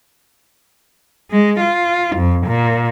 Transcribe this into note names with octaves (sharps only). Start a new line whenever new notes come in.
G#3
F4
F2
A#2